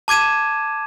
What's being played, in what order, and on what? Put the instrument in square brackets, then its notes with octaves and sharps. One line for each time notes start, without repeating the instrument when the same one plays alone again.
[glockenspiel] A5 D6 G#6 D#7 E7